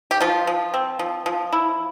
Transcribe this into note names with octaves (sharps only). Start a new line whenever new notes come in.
G4
F3 F4
F3
C4
F3
F3
E4